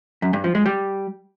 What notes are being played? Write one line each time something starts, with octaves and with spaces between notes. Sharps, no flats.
F#2
G2
F3
G#3
G3